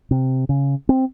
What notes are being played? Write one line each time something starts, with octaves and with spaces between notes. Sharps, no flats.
C3
C#3
C4